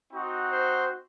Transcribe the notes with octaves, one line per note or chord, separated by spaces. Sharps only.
C4 D#4 F#4
C5